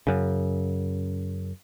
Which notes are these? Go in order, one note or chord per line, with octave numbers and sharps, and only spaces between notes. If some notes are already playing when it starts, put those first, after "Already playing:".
F#2 C#3